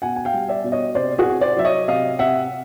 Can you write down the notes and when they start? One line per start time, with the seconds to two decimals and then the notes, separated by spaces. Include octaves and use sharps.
0.02 B2 F#5 G#5
0.16 G#5
0.25 F5 G5
0.34 G3
0.49 D5 E5
0.64 B2
0.72 C#5 D#5
0.95 C3 C5 D5
1.19 F#4 G#4
1.26 C3
1.41 C5 D5
1.57 F#3 E5
1.64 C#5 D#5
1.88 C3 D#5 F5
2.19 C3 E5 F#5